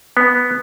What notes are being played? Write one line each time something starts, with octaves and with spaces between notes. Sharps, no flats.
B3